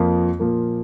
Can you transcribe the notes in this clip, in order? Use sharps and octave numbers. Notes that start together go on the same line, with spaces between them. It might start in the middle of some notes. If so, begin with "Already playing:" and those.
Already playing: F2 F3 A#3 F4
A#2 F3 A#3